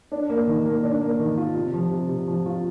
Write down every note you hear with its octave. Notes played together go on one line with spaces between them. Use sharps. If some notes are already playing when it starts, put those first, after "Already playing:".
D4
A#3
D#3
A#3
D4
A#3
D#3
F4
C3
F3
C3
C3
F3
F4